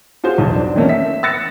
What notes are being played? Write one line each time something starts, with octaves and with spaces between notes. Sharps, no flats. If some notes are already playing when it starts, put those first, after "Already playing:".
F4 F#4 G#4 C5
B1 E2
D4
D#3 E3 A3 A#3 C4 C#4
E5 B6
E6 F#6 A6 A#6 C#7